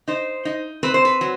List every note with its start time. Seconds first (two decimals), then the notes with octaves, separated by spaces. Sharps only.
0.08 D#4 C5
0.45 D#4
0.83 C4 B4
0.94 C5
1.05 B4
1.21 F#3